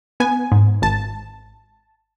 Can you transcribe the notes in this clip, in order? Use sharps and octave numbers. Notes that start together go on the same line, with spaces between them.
B3 G#5
G#2
G#1 A5